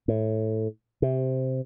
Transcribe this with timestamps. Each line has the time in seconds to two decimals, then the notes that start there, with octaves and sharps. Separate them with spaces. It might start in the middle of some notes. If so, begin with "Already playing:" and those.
0.08 A2
1.02 C3